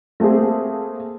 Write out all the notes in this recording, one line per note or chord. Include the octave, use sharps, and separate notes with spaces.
A3 A#3 C4 G#4